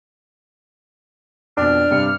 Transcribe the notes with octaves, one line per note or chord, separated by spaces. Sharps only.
F2 B2 D4 F6
G2 C3 C#7